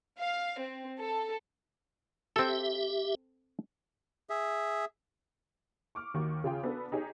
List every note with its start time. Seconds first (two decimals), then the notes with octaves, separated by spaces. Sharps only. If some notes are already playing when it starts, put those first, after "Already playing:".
0.17 F5
0.60 C4
0.99 A4
2.36 C4 G4 A4 E5
4.30 G#4 E5
5.95 C#6 D6 F6
6.14 D#2 D#3 F#4 C#6
6.44 C#3 F4 G5
6.63 B3 D4 F#4 A4 B4
6.92 D#4 G4 G#4 C#5